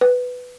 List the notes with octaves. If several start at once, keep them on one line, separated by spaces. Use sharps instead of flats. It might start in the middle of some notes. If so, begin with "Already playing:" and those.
B4